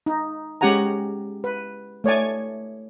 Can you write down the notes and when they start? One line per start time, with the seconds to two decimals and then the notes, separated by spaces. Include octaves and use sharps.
0.06 D#4
0.61 G#3 C#4 G4 F#5 G#5 A#5
1.44 B4
2.04 A3 C#5 D5 G#5